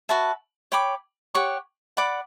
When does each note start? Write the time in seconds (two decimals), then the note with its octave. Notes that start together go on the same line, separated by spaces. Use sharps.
0.09 F#4 B4 E5 A5
0.72 C#5 G5 B5 D6
1.35 G4 C#5 F#5 C#6
1.97 D5 F#5 B5 D6